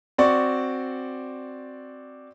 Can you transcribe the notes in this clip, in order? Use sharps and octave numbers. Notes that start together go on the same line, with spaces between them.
C4 F#4 D5 C#6